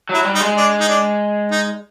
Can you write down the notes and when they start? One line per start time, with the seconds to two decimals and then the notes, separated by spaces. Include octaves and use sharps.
0.09 F#3 E4
0.24 G3
0.35 D#4
0.41 G#3
0.57 D4
0.81 D#4
0.89 D4
1.52 D#4